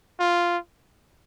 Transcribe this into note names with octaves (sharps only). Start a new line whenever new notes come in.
F4